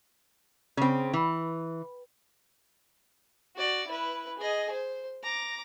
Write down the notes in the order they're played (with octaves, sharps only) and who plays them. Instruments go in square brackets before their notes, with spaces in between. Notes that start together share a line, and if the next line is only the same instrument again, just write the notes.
[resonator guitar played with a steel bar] C#3 C4
E3
[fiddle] F#4 D5
E4 B4
G#4 D#5
C5
A#5 D6